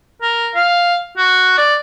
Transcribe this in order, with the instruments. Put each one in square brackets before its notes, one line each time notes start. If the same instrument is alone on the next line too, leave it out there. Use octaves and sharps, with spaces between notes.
[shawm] A#4
F5
F#4
D5